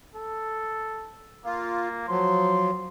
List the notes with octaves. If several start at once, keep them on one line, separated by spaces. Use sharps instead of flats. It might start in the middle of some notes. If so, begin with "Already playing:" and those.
A4
A#3 F4
F3 F#3 C6